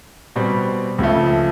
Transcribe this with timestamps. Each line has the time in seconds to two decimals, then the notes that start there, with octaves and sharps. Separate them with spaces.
0.36 B2 G3 C4
0.98 C#2 C#3 F3 A3